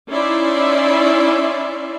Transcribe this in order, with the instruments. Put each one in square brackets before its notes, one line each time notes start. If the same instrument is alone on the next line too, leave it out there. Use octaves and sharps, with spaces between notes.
[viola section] C#4 D#4 E4 D5 E5 C6